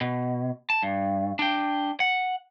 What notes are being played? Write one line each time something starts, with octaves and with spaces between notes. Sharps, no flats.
B2
A5
G2
D4 G5
F#5